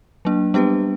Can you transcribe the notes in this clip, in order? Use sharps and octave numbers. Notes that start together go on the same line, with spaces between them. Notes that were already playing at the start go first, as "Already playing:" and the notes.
F#3 A#3 D4
G3 B3 D4 G4 B4